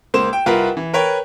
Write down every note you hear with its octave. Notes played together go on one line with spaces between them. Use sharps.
C#2 A#3 C5 E7
G5
C2 F4 A#4 B4 F#5
E3
A#4 B4 C#5 G5